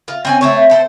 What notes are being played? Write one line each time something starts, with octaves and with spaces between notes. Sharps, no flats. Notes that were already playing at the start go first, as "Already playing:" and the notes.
F4
C4 C#4 G#5
A3 C4 C#5
C4 A4 C5